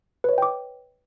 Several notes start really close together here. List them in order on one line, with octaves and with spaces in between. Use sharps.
B4 C#5 D#5 G5 D6